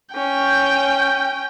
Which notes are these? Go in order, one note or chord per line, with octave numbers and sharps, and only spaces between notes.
C#4 G5